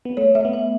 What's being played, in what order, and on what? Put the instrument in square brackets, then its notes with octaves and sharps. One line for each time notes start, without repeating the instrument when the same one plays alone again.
[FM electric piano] B3
[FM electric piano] A3 [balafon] C#5
[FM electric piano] A3 [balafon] E5
[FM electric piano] B3
[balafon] E5